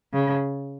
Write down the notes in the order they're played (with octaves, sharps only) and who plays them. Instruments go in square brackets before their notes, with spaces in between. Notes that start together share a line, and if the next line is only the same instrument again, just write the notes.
[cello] C#3